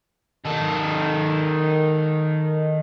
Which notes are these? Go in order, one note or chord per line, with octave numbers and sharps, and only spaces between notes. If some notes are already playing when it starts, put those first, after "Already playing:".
D#3 A4